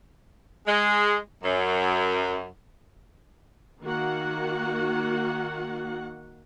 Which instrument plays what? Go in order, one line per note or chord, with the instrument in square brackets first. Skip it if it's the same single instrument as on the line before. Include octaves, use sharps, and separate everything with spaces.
[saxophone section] G#3
F#2
[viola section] D#3 A#3 F#4 F#5